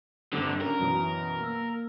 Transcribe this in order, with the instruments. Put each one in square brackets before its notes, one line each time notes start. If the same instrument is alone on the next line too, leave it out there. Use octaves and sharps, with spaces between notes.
[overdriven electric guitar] G2 D3 [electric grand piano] G3 C4 D6
[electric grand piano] C#4 [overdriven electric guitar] A#4
[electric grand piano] F#2 B2 E3
A#3 E6